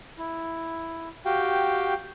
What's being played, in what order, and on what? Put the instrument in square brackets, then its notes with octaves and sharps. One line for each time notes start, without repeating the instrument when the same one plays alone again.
[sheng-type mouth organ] E4
F#4 G4 F5 G5